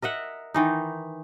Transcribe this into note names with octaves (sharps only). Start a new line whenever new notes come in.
A#4 D#5 E5 F#5
D#3 E3 D#4